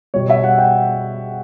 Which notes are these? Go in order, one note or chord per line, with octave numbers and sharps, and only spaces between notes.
B2 G3 C#5
E5
F#5
G5